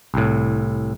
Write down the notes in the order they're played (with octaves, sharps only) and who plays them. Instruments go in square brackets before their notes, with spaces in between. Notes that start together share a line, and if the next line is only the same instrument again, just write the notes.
[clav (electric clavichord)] C2 A2